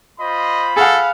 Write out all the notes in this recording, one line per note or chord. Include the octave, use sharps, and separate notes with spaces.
F4 C5 D#5 B5
G#4 A4 F5 F#5